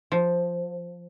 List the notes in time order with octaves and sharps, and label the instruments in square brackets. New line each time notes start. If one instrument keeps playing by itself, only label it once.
[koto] F3